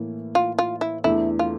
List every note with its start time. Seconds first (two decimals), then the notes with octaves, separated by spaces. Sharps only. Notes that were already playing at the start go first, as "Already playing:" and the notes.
Already playing: A2 E3 A#3
0.35 F4
0.59 F4
0.81 E4
1.04 E2 E3 A3 D4 E4 A4
1.39 F4